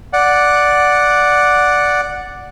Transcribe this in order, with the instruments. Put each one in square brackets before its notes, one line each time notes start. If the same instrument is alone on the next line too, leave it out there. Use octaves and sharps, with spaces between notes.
[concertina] D5 F#5